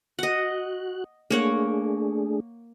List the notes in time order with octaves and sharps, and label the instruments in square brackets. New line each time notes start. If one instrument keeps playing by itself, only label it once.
[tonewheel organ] F#4 F#6 [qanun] D#5 F#5
[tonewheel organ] A3 D4 G#4 [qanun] A#3 C#5 F#5